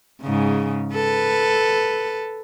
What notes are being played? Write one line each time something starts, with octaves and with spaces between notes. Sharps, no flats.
G#2 C#3
A4 B4